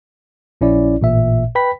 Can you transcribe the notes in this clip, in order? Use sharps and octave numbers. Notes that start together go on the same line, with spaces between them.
A#1 C#4 E4 D5
A1 A#2 E5
B4 G5 B5 B6